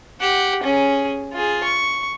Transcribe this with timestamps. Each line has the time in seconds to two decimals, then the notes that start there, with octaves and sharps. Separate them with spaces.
0.21 G4 F#5
0.63 C#4 G#4
1.33 F4 G#4
1.64 C#6